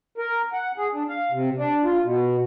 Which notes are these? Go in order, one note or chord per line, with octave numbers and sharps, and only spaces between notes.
A#4
F#5
G#4
D4
F5
C3
D4
F4
B2